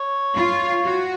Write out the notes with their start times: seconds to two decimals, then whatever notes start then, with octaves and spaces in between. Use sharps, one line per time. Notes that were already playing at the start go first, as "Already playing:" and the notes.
Already playing: C#5
0.36 F4
0.85 F#4